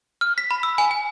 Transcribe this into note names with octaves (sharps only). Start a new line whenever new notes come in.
F6
B6
B5
E6
G#5
G#5